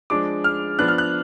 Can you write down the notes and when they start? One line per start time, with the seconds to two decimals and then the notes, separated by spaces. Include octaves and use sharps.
0.10 F3 G#3 D4 D6
0.44 F6
0.78 F3 B3 D4 F#6
0.88 F6
0.98 F#6